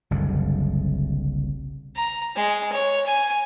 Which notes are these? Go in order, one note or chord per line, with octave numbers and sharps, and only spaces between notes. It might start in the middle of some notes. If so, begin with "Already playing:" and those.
F#1 C2 F#2 D3
A#5
G#3
C#5
G#5